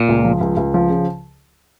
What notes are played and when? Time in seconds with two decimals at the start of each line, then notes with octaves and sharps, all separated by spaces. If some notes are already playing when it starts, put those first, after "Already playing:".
Already playing: A#2
0.08 C#2
0.25 F3
0.41 C#2
0.57 C#2
0.74 F3
0.90 C#3